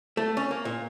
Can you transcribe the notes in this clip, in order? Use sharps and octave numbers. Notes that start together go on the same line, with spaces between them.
A3
C#4
A#3
A#2